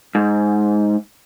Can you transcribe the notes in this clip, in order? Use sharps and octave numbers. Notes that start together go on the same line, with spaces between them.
G#2